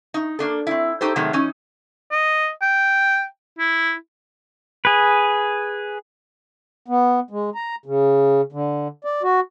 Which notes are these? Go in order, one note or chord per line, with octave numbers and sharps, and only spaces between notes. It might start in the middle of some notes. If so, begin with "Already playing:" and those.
D#4
A#3 D4 A4
C4 E4
D#4 G4 A4 C5
C3 D#3 F#3 G#3 A3
E3 C#4 D#4
D#5
G5
E4
G#4 B4
B3
G#3
A#5
C#3
D3
D5
F#4